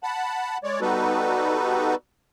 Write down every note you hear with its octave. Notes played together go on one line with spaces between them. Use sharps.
F#5 A5 B5
G#3 C#5 D5
G3 B3 D#4 F#4 A4 B4